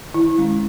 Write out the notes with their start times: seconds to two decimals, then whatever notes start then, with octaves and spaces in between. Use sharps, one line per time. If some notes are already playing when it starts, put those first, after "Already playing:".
0.14 D#3 E4
0.38 G#3 C#4